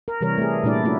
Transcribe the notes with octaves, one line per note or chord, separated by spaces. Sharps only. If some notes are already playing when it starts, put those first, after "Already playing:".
A#4
C3 E3 G3 A#4 C#5
A3 G#4
A#2 G3 A3 D4 E4 D5
A3 C#4 E4 F#4